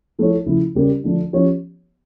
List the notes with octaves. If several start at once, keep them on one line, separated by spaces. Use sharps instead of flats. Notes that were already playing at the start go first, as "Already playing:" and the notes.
F3 A3 E4 A4 C#5
C#3 F3 A3 E4
C#3 G3 C#4 G4 A#4
D3 F3 A3 D4
F3 C#4 G4 C#5